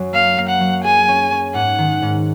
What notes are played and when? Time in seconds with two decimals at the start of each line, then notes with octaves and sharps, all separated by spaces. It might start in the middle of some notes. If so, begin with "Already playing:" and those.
Already playing: F#2 F#3
0.13 A#3 F5
0.37 A#3
0.49 F#5
0.60 F#3
0.84 G#4 G#5
1.08 C#4
1.32 C#4
1.54 G#2 F#5
1.78 D#3
2.02 G#2